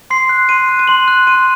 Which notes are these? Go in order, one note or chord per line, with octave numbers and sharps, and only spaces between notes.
C6 C7
F#6
C6 D#7
F#6
D#7
C6 F#7
F#6
C6 D#7